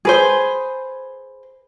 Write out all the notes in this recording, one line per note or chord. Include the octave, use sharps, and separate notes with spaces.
G#4 B4 C5